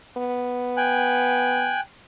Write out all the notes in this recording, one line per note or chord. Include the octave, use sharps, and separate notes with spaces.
B3
G5 G#5 F#6